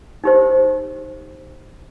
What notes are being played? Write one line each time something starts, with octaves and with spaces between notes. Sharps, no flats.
D#4 G4 C5